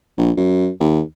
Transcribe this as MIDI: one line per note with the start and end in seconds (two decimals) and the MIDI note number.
0.18 0.31 34
0.37 0.68 42
0.80 1.01 39